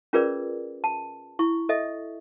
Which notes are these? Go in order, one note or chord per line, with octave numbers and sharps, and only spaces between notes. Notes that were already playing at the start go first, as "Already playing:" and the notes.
C#4 F4 G#4 A#4 B4 D5
A5
E4 C#6
A4 D#5 E5